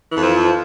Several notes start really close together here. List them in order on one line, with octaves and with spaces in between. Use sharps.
E3 F2 F3